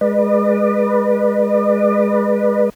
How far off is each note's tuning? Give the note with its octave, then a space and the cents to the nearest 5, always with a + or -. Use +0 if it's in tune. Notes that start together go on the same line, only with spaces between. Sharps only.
G#3 +0 B4 -15 D5 +45